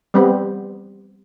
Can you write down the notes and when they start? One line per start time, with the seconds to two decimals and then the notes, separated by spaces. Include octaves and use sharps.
0.14 G3 B3 C4